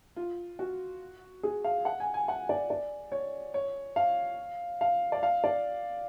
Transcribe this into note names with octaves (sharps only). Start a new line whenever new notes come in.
F4
F#4
G#4
F5
F#5
G#5
G#5
F#5
D5
D5
C#5
C#5
F5
F5
D5
F5
D5